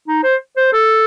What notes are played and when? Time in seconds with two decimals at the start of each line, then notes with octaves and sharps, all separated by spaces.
0.08 D#4
0.24 C5
0.56 C5
0.73 A4